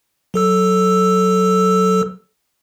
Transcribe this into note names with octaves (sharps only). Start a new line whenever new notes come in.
F#3 A4 E6